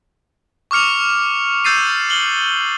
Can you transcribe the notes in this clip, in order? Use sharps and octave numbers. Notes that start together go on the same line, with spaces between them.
C#6 D6 F6 C#7 F7
E6 G6 A6 C7 D#7
F6 F#7 G7